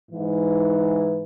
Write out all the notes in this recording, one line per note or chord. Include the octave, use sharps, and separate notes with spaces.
G#2 E3